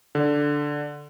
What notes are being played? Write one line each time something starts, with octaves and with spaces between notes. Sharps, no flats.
D3